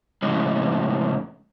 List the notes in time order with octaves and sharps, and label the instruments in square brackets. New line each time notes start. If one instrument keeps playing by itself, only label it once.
[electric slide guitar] F2 A2 C#3 G#3 C#4